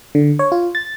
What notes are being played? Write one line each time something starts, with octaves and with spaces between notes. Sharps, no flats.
D3
C#5
F4
A6